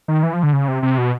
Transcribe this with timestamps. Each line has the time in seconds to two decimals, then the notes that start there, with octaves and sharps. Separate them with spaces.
0.08 D#3
0.23 E3
0.33 F3
0.43 D3
0.53 C#3
0.68 C3
0.83 C3
0.98 B2